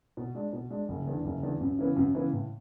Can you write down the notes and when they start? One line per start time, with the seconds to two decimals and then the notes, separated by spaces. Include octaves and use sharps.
0.17 B2
0.35 G#3 D4
0.53 B2
0.70 G#3 D4
0.89 F#1
1.07 E2 D3
1.25 F#1
1.43 E2 D3
1.61 F#2
1.79 C#3 E3 B3
1.96 F#2
2.15 C#3 E3 B3
2.32 A2